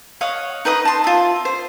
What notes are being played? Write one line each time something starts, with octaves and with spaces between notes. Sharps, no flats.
C#5 D#5 F5 F#5
D#4 B4 D#5 D#6
A5 C6
F4 E5
C5